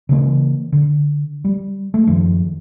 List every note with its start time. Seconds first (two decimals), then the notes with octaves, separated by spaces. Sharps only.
0.09 C#3 E3 A#3
0.72 D3
1.44 G3
1.94 A3
2.07 F#2 D#3 F3